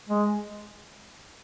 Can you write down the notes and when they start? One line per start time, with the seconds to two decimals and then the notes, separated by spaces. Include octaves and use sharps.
0.09 G#3